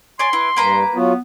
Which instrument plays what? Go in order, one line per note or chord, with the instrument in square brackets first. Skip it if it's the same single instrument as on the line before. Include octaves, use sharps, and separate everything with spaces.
[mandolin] C#5 D5 G#5 [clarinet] C6
[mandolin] E4 [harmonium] B4
[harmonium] G2 [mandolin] A#3 B4 A#5
[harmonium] F#3 F4 F#4 [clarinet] B3